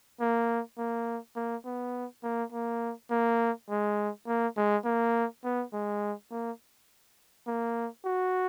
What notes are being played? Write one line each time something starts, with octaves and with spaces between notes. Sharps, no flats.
A#3
A#3
A#3
B3
A#3
A#3
A#3
G#3
A#3
G#3
A#3
B3
G#3
A#3
A#3
F#4